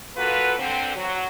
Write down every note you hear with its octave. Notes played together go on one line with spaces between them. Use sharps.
A#3 F4 F#4 A4 B4
D3 C4
F#3